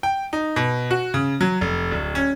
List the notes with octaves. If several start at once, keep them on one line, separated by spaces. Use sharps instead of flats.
G5
D#4
B2
F#4
C#3
F#3
F1
D1
C#4